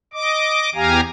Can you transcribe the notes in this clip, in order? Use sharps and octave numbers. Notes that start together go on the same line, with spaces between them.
D#5 D6
E2 G4 F5 G#5 A#5